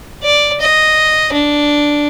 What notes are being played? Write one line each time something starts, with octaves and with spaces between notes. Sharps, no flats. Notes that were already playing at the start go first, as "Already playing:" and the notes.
D5
D#5
D4